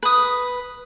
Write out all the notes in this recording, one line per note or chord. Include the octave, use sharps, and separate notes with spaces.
B4 D#6